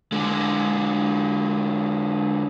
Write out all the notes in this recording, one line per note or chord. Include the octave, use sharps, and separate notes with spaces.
D3 G#3